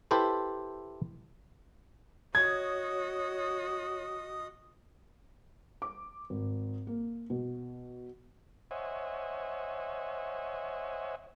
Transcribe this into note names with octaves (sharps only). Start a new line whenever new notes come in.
E4 G4 A4 B4 C5
F#4 C#5 D#5 D#6 G#6
D6
G#1
A#3
B2
C5 C#5 D#5 E5 F#5 G#5